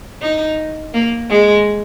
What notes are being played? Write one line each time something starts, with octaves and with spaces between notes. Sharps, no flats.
D#4
A#3
G#3